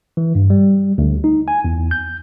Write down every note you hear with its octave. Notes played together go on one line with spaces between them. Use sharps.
E3
G2
G3
D2
D#4
G#5
E2
G6